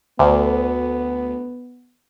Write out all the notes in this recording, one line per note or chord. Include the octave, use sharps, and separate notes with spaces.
D2 B3